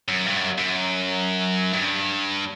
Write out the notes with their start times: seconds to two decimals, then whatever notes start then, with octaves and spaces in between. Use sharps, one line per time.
0.08 F#2
0.26 G2
0.37 F#2
0.58 F#2
1.73 G2